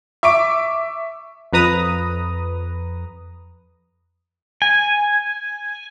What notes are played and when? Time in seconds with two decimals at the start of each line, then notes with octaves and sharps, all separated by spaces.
0.23 E5 C#6 D6 D7
1.53 F2 B4 A#5 D#6
4.62 G#5